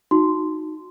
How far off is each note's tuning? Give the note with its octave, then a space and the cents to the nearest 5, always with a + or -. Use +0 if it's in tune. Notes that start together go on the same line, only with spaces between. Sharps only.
D#4 +0 F#4 -15 C6 -10